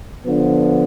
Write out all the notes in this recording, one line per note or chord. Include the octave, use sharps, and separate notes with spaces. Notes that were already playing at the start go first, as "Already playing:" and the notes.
D3 F3 B3